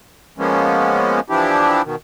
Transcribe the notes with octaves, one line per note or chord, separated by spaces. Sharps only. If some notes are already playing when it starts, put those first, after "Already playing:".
F3 G#3 A#3 B3 C#4
E3 F3 D4 E4 G4
B2 D#3